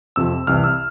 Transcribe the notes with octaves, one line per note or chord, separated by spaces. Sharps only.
F2 C3 F3 E6
C2 C3 E3 F6
E6